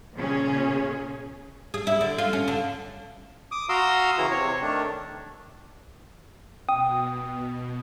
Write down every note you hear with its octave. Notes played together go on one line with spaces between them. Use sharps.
A#2 C#3 C#4 G#4
G#4
E4
D3
F4
C#4
D3
D6 D#6
F#4 F5 A#5 C6 D#6 E6
C#3 E3 E4 A#5
C3 C#5
D#3 A3 D4
B2 G5 D#6